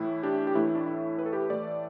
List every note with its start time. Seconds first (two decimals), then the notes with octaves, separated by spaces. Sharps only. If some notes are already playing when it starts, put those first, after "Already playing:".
Already playing: A2 E3 A3 E4
0.23 D4 G4
0.47 G4
0.55 A2 E3 A3 E4
0.75 D4
0.86 E4
1.19 B4
1.26 A4
1.33 G4 B4
1.50 A2 E3 A3 A4 D5